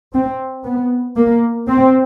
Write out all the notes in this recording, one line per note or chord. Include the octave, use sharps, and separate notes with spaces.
C4
B3
A#3
C4